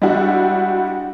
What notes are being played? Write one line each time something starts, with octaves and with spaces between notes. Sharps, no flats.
G3 G#3 D4 E4 F#4 G4